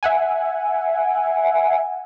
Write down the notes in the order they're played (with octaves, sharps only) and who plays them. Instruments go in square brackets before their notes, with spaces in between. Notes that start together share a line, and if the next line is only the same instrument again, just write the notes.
[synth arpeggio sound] E5 F#5 G#5